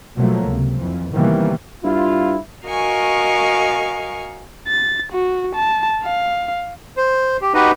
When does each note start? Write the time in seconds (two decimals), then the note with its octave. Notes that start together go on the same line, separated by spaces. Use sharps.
0.16 B2 F3 F#3 A3 A#3
0.45 C#2 C3
0.79 F2 E3
1.13 C3 D#3 E3 G3 A#3 B3
1.84 G2 E4 F4
2.67 F#4 A#4 D#5 F5 G#5 C#6
4.68 A6
5.12 F#4
5.55 A5
6.04 F5
6.97 C5
7.42 G4
7.54 D#4 F#4 G4 B4 D#5